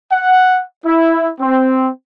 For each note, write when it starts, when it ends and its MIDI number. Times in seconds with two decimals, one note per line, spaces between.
0.12 0.61 78
0.85 1.29 64
1.40 1.89 60